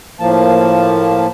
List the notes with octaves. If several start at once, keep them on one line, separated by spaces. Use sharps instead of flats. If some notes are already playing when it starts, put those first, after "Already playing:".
A2 F3 A#3 A5